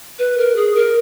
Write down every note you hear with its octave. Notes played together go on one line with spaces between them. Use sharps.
B4
A#4
G#4
A#4